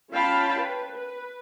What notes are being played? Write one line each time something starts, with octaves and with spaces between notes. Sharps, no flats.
C#4 F4 F5 G5 A5 B5
B4
B4